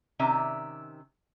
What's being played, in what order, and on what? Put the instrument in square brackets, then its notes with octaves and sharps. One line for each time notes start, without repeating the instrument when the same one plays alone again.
[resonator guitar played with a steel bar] C3 D#3 C#4 D5 E5 A#5